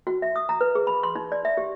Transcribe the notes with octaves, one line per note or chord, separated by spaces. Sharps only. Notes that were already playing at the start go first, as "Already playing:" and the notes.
F#4
E5
D#6
A#5
B4
G#4
B5
C6
D#4
D5
E5
G4